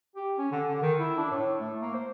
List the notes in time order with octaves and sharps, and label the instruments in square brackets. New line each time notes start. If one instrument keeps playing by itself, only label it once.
[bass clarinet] G4
C#4
D3
D3
D#3
E4
D4
A2
A3
A#3
C5